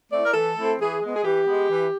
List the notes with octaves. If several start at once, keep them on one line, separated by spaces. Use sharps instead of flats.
A3 C4 E4 D5
A#4
E3 A4
A3 C4 E4
E3 G#4
G#3 B3
G#4
E3 G4
G#3 B3
E3